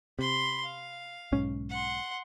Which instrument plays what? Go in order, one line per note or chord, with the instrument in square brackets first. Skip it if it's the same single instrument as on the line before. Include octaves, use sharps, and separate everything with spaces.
[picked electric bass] C3 [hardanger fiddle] B5 C6
[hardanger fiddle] F5
[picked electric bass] B1 G#2 C#4
[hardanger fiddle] F#5 C6